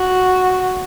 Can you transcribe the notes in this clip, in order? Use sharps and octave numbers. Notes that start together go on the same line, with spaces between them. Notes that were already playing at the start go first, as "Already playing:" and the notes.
Already playing: F#4